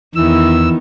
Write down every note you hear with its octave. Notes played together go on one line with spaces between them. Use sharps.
E2 D#3 B3 E4 E6